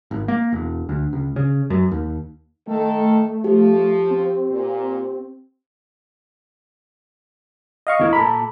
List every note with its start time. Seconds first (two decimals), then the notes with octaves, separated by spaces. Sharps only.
0.11 G#1
0.28 A#3
0.53 E1
0.89 D2
1.13 C#2
1.36 C#3
1.70 F#2
1.91 D#2
2.67 D#3 A3 A4
3.44 F3 G4
4.11 C4
4.50 A#2
7.87 D#5 F5 C#6
8.00 E2 E4 A#4
8.13 A#2 A4 A#5 B5